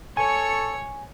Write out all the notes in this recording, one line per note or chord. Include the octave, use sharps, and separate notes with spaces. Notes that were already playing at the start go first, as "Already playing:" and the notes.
A4 C#5 G#5 C#6